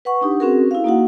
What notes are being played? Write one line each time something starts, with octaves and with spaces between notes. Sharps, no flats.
B4 F#5 C#6
D4 D#4 G4
C4 C#4 F#4 G#4 A#4
E4 F5
A#3 D#4 F#4 F#5